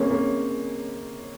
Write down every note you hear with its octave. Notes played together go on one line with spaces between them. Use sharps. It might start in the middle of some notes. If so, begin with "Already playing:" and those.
Already playing: G#3 A#3 C4 C#4
A#3 C#4